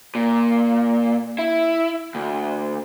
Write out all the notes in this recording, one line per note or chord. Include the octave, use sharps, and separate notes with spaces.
A#2
E4
D2